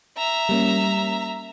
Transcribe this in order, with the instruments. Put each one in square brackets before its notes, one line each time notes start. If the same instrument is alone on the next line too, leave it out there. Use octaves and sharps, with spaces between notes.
[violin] E5 A#5
[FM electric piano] G3 A#3 C#4